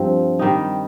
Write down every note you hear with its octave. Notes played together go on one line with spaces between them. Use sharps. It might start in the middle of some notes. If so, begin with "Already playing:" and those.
Already playing: G2 F3 C4
D#3 G3 D#4